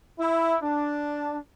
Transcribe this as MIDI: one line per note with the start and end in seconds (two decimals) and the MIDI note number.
0.19 0.56 64
0.62 1.37 62